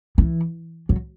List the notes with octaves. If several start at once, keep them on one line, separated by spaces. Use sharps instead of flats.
E3
F#3